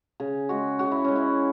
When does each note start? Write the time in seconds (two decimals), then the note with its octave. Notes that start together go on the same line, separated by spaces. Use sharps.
0.20 C#3 G#4
0.49 G#3 F#4
0.79 C#3 F#4
0.92 E4
1.04 G#3 C#4
1.16 E4